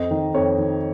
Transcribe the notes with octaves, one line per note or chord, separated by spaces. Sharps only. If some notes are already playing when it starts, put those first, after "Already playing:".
Already playing: F2 D#5
D#3
F2 C#5
D#3